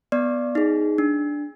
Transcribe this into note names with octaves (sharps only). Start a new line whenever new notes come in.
B3 D5
D#4 G#4
D4